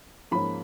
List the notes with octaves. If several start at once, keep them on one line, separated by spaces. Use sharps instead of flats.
G#2 F3 A#3 C#4 B5